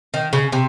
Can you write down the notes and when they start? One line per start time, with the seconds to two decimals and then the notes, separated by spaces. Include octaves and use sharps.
0.14 D#3
0.33 C#3
0.52 C3